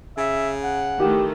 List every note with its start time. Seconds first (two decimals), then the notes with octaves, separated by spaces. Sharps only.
0.18 C#3 E5
0.63 F#5
1.00 D#3 E3 A3 G4